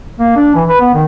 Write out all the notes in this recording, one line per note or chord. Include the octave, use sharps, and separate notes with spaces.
A#3
D4
E3
B4
B3
D#3